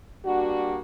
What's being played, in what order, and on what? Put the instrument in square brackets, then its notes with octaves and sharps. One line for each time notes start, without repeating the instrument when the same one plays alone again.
[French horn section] G3 A#3 D4 F#4